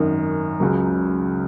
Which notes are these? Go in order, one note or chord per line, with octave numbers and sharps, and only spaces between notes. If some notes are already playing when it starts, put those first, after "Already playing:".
Already playing: G#1 F#2 D#3
C#2 C#3 F#3